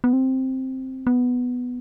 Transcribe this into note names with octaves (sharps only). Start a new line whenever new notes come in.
B3
C4
B3